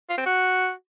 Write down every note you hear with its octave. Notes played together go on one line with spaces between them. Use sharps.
F4
C4
F#4